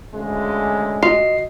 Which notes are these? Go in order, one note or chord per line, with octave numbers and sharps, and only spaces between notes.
D2 C#3 G#3
F4 F#4 D#5 C7